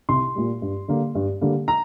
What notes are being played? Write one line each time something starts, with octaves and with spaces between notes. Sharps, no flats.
C2 C6
A#2 G3
G2
D3 G3 A#3
G2
D3 G3 A#3
A#5